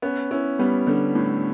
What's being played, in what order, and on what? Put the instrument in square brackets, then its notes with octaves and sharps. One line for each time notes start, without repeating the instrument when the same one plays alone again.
[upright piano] B3 [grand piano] C#4
[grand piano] C#4 [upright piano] E4
[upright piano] G3 [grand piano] B3
[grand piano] D3 [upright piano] G3
[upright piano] A2